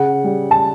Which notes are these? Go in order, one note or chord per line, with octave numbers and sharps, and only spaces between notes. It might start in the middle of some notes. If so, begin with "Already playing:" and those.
Already playing: C#3 F#5
G3
A5